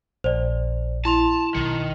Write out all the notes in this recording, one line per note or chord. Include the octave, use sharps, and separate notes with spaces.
A#1 C5 D5
E4 A5 C6 F7
B1 D#3 C#7